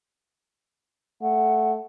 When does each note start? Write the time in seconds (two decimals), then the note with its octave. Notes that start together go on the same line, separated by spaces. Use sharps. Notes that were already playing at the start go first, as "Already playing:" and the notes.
1.22 A3 F#5